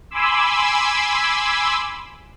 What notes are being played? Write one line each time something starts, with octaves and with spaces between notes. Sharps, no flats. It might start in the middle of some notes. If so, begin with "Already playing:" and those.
G#5 B5 C6 D6 E6